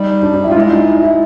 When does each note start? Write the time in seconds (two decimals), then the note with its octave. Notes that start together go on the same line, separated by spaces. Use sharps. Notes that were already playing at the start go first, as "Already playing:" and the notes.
Already playing: G3 D#4
0.23 D4
0.34 D4
0.44 E4
0.48 G3
0.51 F4
0.55 G#3 E4
0.71 D#4
0.88 E4
1.03 E4